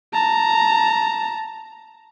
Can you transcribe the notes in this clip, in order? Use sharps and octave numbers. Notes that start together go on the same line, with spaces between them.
A5 A#5